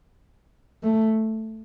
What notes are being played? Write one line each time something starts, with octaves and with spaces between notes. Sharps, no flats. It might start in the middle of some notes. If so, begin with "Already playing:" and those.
A3